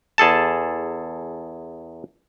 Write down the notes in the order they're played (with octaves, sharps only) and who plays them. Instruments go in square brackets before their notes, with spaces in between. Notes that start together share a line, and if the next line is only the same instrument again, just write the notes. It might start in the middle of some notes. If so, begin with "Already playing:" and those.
[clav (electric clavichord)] E2 G#4 A4 A5